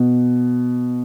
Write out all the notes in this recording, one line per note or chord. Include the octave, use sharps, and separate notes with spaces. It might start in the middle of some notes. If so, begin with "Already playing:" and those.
Already playing: B2